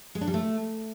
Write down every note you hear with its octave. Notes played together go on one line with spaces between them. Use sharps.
G#3
D4
G3
A3